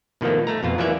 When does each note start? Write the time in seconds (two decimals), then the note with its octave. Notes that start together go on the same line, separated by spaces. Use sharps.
0.21 B2 D#3 F3 A3 A#3
0.47 A3 A#5
0.63 F2 B2 F4
0.78 E3 F#3 A#3 C#4 D5 E5